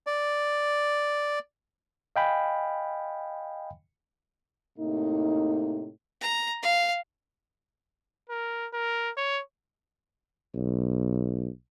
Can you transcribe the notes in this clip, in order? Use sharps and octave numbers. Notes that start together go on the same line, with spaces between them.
D5
D#5 F5 G5 G#5 B5
A2 C3 A#3 D#4
A#5
F5
A#4
A#4
C#5
B1